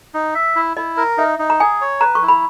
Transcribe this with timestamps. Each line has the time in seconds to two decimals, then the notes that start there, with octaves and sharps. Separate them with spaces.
0.14 D#4
0.35 E5
0.56 E4
0.77 E4 D#5
0.97 A#4
1.18 D#4 E5
1.39 D#4
1.50 A#5
1.60 G#4 G#5
1.81 C#5
2.01 B4 A#5
2.15 C#6
2.23 E4
2.28 B5